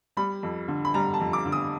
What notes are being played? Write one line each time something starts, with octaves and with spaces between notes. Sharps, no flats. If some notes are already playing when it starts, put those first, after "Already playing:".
G3 B5
F2
D3
B5
G3 A#5
A5
F2
D6
D3
D#6